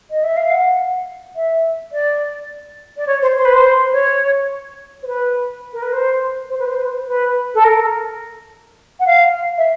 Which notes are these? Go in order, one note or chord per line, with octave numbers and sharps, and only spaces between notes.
D#5
E5
F5
F#5
E5
D5
D5
C#5
C5
C5
B4
C5
C5
C#5
C5
B4
A#4
B4
C5
C5
B4
C5
B4
C5
B4
A4
A#4
F#5
F5
E5